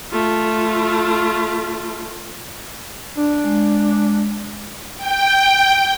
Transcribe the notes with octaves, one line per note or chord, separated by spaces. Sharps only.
A3 F4
D4
G#3
G5